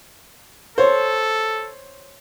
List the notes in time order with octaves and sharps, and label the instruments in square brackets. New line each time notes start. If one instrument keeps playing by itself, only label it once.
[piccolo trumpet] A4 [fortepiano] C5 C#5